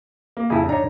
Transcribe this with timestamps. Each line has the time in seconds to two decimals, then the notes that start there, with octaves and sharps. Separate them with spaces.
0.37 A#3
0.50 F2 C#3 E4 G#4
0.69 D4 D#4 C#5 A#5